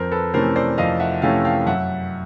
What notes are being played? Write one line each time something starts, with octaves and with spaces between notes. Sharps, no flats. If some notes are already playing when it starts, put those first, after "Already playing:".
Already playing: F2 A#4 C5
A4 B4
C3 E3 A3 C#4 A#4 C5
C5 D5
F2 D#5 F5
E5 F#5
C3 E3 A3 C#4 F5 G5
F5 G5
F#2 E5 F#5